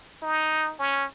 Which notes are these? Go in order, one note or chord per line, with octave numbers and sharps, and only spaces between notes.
D#4
C#4